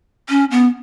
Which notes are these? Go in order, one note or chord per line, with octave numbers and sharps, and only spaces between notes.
C#4
B3